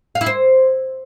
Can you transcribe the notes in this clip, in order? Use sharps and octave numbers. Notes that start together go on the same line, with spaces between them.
F5
E4
C5